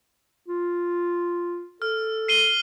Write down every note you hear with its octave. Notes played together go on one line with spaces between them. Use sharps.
F4
A4 F6
C7 D#7 G7